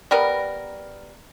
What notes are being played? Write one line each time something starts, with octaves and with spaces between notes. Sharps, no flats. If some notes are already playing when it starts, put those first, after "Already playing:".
G3 B3 A#4